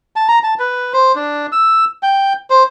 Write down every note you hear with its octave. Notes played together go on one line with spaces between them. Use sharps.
A5
A#5
A5
B4
C5
D4
E6
G5
C5